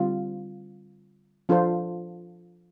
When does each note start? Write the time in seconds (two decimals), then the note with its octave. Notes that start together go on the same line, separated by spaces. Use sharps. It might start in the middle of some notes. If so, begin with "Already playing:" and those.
Already playing: D3 G3 C4 F4
1.49 F3 D4 F4 A4 C5